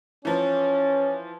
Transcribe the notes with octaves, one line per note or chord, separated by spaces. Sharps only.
E3 F3 C#4